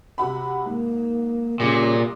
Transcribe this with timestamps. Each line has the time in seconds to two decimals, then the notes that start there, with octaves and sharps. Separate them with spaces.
0.18 C3 F#4 B5
0.66 G#2 A#3
1.60 C2 A#2 C#3 D6